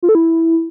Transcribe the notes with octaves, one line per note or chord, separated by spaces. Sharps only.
F4
A4
E4